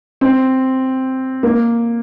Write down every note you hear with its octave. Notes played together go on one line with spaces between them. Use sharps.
C4
A#3